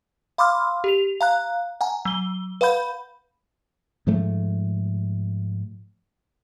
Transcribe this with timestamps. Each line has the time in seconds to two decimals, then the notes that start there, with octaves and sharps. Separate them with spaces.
0.38 F5 B5 C6 D6 E6 F6
0.84 G4 F7
1.21 F5 A#5 F#6
1.81 F#5 G#5 A#5
2.05 F#3 G7
2.61 B4 F5 F#5 B5 G6
4.07 G#2 F3 A3